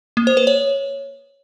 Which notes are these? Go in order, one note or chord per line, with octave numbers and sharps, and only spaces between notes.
A#3
C5
B4
C#5